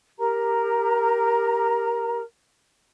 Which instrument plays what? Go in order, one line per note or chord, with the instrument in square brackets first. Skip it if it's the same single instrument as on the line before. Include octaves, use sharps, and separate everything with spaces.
[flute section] G4 A#4 A#5